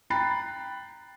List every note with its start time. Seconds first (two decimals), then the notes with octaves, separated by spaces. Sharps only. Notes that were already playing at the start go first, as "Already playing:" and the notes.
0.10 G5 A#5 B5 F#6 A6 C7